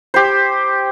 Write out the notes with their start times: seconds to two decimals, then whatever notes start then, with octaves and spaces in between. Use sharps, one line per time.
0.14 G4 C5